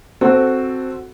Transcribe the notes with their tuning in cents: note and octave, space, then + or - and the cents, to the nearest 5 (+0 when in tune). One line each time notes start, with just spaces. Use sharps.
C4 +0 F#4 +0 A4 +0